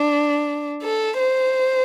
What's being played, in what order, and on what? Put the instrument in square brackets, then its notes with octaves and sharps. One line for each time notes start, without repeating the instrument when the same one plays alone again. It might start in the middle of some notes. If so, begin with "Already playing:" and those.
Already playing: [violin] D4
A4
C5